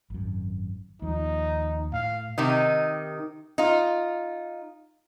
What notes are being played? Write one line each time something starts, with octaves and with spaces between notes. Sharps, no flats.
G#1 F#2
D#2 F3 D#4
A2 F5
C3 D#3 D#4
D#4 F4